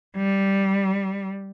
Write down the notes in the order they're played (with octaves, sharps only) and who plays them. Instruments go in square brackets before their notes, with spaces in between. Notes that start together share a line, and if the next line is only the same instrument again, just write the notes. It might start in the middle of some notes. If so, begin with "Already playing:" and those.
[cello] G3